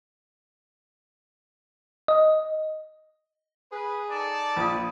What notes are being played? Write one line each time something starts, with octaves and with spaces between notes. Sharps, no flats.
D#5
G#4 B4
D#4 A4 D5 A5
A#1 F4 B4 D#6